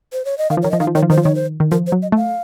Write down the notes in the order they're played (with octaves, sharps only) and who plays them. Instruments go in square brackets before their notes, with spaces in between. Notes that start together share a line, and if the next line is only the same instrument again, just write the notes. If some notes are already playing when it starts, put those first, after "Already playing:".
[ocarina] C5
C#5
D#5
[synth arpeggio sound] D#3 [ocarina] F5
[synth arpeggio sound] F3
[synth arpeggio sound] D#3 [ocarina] C#5
[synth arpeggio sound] F3 [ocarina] D#5
[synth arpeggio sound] D#3 [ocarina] F5
[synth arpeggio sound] F3
[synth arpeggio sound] D#3 [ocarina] C#5
[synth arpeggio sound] F3
[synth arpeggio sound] D#3 [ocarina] C5
[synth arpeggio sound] F3
[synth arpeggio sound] D#3 [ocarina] C#5
[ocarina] C5
[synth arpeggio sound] D#3
[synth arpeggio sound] F3 [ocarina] A#4
[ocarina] C5
[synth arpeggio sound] F#3
[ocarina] D#5
[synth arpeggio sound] A3 [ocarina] F5